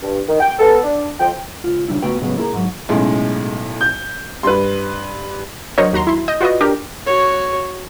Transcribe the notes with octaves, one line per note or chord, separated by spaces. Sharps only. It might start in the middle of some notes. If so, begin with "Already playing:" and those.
G2
D#3
G5
B3 A4
D4
F2 F3 G5
C#2 F4
C#3 G3 D4 E4
C#2 A3 B3 F#4 B4 G5
A2 C#3 F#3 G#3 A3 B3
A#3 E4 G#4 A#4
G#2 F#3
B1 A2 C#3 G#3
G6
G2 B4 C6
F#3 D4 A#4 C5 C#5 D#5
D#2 F#4 A#5 C6
E4 C6
D#5 G6
F4 F#4 B4 D5 D#5
D4 G4 A#4
F#4 C#5